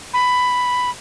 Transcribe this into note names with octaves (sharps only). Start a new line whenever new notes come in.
B5